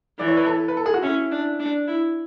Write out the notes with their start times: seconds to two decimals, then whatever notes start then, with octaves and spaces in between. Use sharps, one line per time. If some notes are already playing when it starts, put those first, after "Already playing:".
0.19 E3 D5
0.28 C#5
0.37 B4
0.46 A4
0.68 B4
0.77 A4
0.86 G#4
0.94 F#4
1.02 C#4 E4
1.31 D4
1.59 D4
1.87 E4